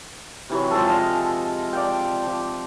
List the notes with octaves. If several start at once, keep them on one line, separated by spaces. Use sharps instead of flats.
C3 E3 F#3
F3 G#3 G#4 A4
F3 D#5 F5
D5 F5 G5
F3